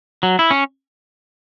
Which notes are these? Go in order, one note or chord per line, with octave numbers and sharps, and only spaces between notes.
F#3
E4
C#4